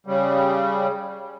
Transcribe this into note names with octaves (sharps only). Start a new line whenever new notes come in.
C#3 G3